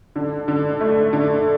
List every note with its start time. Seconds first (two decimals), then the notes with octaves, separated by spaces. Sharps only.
0.16 D3
0.48 D3
0.81 A3
1.13 D3